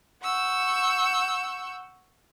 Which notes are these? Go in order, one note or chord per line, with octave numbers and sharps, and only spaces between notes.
F#5 C#6 E6 G6